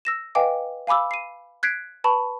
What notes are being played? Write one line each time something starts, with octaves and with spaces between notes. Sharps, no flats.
E6 A#6 E7
B4 D#5 F5 G5 G#5 D6
F5 G#5 B5 D6 E6
C7 D#7
F#6 G#6 B6 C7 D7
B4 A5 B5 C#6